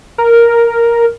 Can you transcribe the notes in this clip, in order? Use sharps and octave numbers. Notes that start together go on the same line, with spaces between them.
A#4